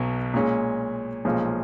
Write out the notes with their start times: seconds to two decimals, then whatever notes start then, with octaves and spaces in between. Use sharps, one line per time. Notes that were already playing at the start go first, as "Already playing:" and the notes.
Already playing: B1 B2 F#3
0.34 A#2 G#3 C#4
1.25 B1 A#2 F3 G#3 C#4